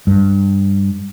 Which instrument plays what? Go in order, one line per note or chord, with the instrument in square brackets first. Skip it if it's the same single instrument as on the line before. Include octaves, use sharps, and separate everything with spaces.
[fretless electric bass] G2